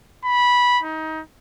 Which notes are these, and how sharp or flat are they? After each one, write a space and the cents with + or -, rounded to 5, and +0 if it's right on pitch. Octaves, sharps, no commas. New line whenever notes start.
B5 -10
D#4 +25